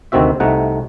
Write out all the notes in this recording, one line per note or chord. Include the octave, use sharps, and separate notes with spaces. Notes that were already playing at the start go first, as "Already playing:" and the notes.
D2 C3 D#3 C4 F#4 E5
C2 C3 A3 D#4 F#5